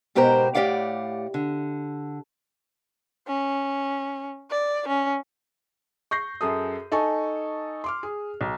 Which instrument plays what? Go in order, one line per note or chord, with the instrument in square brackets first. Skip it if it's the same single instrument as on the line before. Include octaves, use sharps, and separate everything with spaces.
[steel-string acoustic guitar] G#2 B2 G4 A#4 C5 A#5
A2 G4 D5 F5 F#5
D3
[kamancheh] C#4
D5
C#4
[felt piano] C#6 G6 A#6 C7
F#2 G#4 A4 D#6
D#4 A4 G#5 A5 C#6
C6 D6 F6
G#4
B1